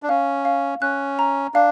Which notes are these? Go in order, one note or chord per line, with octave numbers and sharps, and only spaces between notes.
D4
C#4 F5
F5
C#4 F#6
A#5
D4 F5